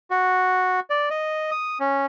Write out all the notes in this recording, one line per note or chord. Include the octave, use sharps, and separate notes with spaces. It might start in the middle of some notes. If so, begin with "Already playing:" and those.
F#4
D5
D#5
D#6
C#4